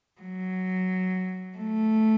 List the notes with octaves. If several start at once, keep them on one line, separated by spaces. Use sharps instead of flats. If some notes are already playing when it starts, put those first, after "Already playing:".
F#3
A3